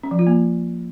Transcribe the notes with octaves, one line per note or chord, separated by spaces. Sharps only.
C#4
F3
F4
A#3